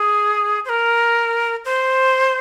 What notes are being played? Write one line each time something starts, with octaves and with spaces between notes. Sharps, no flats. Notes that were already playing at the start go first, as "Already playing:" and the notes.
Already playing: G#4
C5
A#4
C5